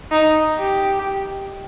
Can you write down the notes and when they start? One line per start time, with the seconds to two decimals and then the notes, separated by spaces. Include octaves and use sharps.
0.12 D#4
0.59 G4